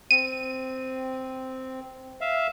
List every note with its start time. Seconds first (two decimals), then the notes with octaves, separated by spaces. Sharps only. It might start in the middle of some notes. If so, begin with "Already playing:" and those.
0.11 C4 D#7
2.21 E5 F5